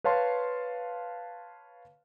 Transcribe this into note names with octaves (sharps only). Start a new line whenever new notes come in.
B4 C#5 F5 A5 C6